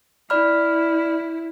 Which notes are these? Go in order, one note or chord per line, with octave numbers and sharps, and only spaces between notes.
E4 D5 B5 F6